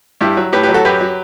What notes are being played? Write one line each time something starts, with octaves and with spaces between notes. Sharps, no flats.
G2 E4 G4
F#3
A2 G4 B4
G4 B4
F#3
F#4 A4
F#2 G4 B4
F#3